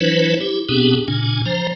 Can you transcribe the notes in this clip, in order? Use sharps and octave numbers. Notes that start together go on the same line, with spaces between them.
E3 F#3 D4 E4 B4 C5
E4 G4
B2 B3 C4 D4 G4 G#4
A#2 C#3 D4 G#5
F3 C5 A#5